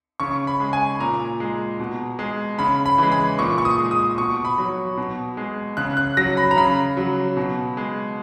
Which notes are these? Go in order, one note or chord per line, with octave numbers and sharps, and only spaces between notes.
C#3 C#6
B5
G#3
G#5
A#2 A#5
G#3
B2
G#3
C#3 B5
B5
E3 G#3
B5
A#2 C#6
C#6
D#6
G#3
D#6
B2 C#6
B5
F#3
B2
G#3
C#3 F#6
F#6
F#3 A#6
B5
A#5
C#3 B5
F#3
B2
G#3